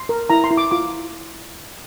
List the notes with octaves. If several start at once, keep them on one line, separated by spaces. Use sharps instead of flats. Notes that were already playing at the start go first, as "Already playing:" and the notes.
Already playing: C6
A#4
E4 A#5
C6
E4
D6
F4 D6